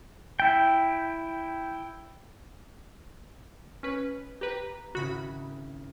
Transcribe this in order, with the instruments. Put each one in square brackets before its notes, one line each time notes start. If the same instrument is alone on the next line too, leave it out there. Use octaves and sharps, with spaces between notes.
[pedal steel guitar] E4 G5
[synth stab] C#4 B4
[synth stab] G4 B4 [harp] A#5
[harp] G#1 C#3 E4 [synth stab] F#4 B5